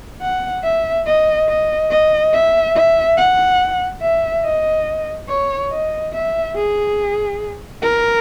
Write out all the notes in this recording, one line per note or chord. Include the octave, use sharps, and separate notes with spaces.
F#5
E5
D#5
D#5
D#5
E5
E5
F#5
E5
D#5
C#5
D#5
E5
G#4
A#4